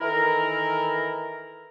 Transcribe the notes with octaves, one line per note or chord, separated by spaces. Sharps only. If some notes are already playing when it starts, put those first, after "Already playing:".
D#3 E3 E4 A4 A#4